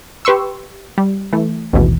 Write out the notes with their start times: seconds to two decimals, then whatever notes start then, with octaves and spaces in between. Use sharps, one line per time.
0.25 G4 B4 C6 C#6 E6
0.98 G3
1.33 E3 A3
1.73 A1 D#2 G#2 B2 E3